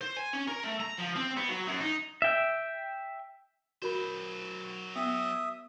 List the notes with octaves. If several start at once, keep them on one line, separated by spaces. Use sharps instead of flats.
C5
G#5
C#4
A#4
A3
A#5
F3
C4
B3
F#3
F#2
D#4
E5 G5
F#3 F#4 A#4 C5 B5
B3 E5 D#6